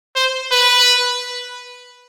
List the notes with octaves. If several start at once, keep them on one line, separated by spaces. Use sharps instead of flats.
C5
B4